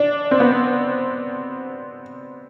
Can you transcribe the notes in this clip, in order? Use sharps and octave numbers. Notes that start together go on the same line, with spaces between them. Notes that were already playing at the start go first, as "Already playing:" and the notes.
Already playing: D4
C4
B3